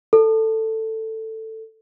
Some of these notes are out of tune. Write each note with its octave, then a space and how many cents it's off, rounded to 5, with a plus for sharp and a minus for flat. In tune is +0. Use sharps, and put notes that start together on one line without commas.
A4 +10